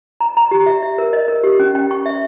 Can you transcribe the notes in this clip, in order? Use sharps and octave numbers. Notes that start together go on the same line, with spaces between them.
A#5
A#5
G4
E5
E5
A#4
D#5
A#4
G4
C#4
G5
C#6
E5